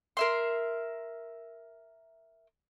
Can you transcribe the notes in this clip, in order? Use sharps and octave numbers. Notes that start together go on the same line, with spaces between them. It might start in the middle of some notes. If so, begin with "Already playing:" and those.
A#4 E5 C6